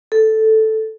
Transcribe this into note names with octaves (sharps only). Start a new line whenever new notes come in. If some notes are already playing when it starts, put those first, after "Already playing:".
A4